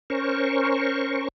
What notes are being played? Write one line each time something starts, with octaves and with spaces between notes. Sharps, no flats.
C#4 A#4 C5 C#6